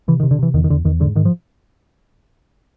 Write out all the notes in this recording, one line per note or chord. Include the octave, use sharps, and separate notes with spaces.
C3 E3
D#3
C3
D3
C3 E3
E2 D#3
D#3
E2 D3
E2 D#3
G#2 D3
G#2 D#3
F3